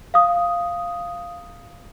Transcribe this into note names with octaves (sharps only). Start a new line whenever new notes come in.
F5 D#6